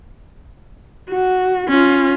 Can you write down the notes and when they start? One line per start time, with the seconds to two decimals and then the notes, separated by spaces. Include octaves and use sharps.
1.10 F#4
1.68 C#4 F4